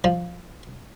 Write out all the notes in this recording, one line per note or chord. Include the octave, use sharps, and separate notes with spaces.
F3